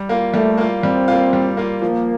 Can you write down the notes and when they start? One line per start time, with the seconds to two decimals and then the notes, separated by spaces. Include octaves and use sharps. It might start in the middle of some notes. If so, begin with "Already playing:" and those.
Already playing: G3
0.09 A#3 F4
0.33 G3 A3
0.58 A#3 F4
0.83 G3 C4
1.08 A#3 F4
1.33 G3
1.57 A#3 F4
1.82 F3 A#3